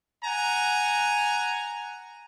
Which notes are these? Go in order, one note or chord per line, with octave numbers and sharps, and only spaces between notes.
F#5 G#5 A#5